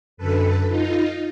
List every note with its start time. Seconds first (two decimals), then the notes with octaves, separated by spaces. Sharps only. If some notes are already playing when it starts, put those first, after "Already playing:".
0.17 F#2 D3 A4 B4
0.69 D#4 F4